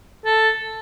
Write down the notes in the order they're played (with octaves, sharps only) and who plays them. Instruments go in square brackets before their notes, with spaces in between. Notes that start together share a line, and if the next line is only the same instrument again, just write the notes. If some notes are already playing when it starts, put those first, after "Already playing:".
[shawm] A4